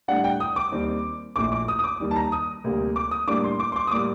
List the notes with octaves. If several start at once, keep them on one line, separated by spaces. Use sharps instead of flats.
A2 G3 D4 F#5
G5
D#6
D6
D#2 D#3 G3 C4 D#4
A#1 A2 A3 D6
D6
D#6
D#6
D6
D#2 D#3 G3
A5
A#5
D#6
D2 C3 G3 A#3
D6
D#6
A2 G3 A#3 D4 D6
C6
D6
C6
D6
D#6
A2 G3 A#3 D6